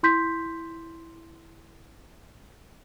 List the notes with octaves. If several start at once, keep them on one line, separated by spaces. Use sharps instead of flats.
E4 C6 G6 B6